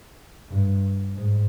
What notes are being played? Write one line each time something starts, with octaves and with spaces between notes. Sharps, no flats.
G2
G#2